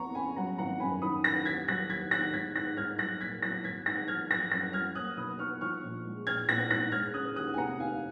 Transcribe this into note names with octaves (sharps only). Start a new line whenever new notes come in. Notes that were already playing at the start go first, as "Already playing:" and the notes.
Already playing: F2 B3 A#5 C#6
C#3 G#5 B5
F#3 F#5 A#5
G#1 F#5 A#5
F#2 G#5 B5
D#3 B5 D#6
D#3 F#6 A#6
D#2 G#6 B6
F#3 F#6 A#6
D#2 G#6 B6
D#3 F#6 A#6
G#2 G#6 B6
G#2 F#6 A#6
G#2 F6 G#6
F#3 F#6 A#6
A#2 G#6 B6
F#3 F#6 A#6
G#1 G#6 B6
G#2 F#6 A#6
F3 F6 G#6
F#3 F#6 A#6
F#2 F#6 A#6
F#3 F6 G#6
A#3 D#6 F#6
B1 B5 D#6
D#4 C#6 F6
F3 C#6 F6
A#1
G#3
A#1 F6 G#6
A#1 F#6 A#6
G#2 F#6 A#6
G#3 F6 G#6
C#3 D#6 F#6
D#2 D#6 F#6
G#5
F1 F#5 A#5
D#2 F5 G#5